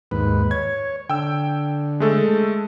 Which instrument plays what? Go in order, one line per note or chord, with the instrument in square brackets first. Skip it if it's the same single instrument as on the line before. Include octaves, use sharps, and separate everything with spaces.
[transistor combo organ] D#2 G#2 B4
[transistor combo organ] C#5 [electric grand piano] G#6
[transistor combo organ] D3 [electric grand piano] G5 E6
[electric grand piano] G#3 A3 A4